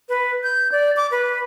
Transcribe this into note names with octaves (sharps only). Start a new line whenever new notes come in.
B4
G6
D5
D6
B4